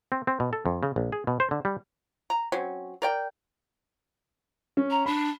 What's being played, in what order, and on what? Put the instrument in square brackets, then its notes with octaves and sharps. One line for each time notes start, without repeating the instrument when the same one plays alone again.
[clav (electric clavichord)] C4
C4
B2
A4
F2
C#3
A#1
G#4
B2
C5
D3
G3
[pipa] A#5
F#3 C4 C#4
A#4 D5 G5
[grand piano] C#4
[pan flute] A#5
[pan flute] D4 [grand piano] B5